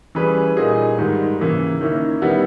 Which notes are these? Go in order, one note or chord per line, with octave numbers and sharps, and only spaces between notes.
E3 G3 C#4 G#4 B4
A#2 G3 A#3 D#4 G#4
G#2 D#3 G3
C#3 E3 A#3
D#3 A#3 C#4 E4
D#3 G3 B3 E4